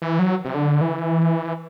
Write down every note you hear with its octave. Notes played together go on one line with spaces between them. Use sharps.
E3
F#3
C3
D3
E3